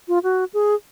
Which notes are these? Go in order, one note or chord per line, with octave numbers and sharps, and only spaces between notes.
F4
F#4
G#4